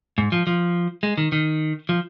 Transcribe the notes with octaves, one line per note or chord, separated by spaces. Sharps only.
G#2
F3
F3
G#3
D#3
D#3
F3